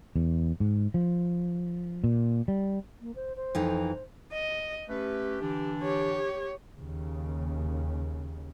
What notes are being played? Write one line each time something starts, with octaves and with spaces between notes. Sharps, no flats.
E2
G#2
F3
A#2
G3
A#3
C5
C5
F2 E3 D#4
D#5
A3 C#4 G4 B4
D3 E3 D4
G4 C#5
D#2 C#3